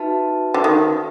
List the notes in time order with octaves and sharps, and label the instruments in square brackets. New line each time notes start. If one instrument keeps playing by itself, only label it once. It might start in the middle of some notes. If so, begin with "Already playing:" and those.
Already playing: [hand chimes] D#4 F#4 B4 E5 A5
[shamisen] D3
D#3